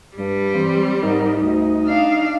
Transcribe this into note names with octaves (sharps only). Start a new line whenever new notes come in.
G2 G3
E3 C4
G#2 D#4 A#4
D2 D#4
D4 F5